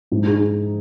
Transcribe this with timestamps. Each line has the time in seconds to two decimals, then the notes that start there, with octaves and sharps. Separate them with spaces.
0.12 G#2
0.27 D#4 G#4